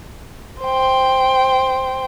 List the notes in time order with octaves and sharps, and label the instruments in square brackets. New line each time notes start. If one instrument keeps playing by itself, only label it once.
[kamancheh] C5 G5